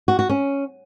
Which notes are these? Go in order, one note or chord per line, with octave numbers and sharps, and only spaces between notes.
F#4
F#4
C#4